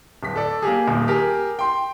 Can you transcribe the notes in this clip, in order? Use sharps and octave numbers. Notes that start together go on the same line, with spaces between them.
D1 B6
A4 D5
A#3 G4 G#4
D#1 D#2
G4 G#4 A#4
G5 C6